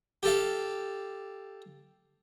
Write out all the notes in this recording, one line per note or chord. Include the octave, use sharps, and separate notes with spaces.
G4 A4 F5